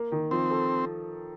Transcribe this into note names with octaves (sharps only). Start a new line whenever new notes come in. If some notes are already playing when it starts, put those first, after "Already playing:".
Already playing: A#3
D#3
F3 C4
A4